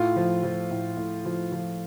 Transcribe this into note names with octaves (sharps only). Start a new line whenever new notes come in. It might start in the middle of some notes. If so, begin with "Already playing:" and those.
Already playing: A2 F4
F3
F3
A2
A2
F3
F3